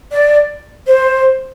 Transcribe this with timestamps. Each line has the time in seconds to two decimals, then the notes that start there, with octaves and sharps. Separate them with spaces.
0.11 D5
0.86 C5